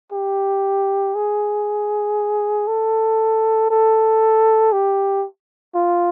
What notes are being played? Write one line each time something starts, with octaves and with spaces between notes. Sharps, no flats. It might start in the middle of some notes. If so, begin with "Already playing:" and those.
G4
G#4
A4
A4
G4
F4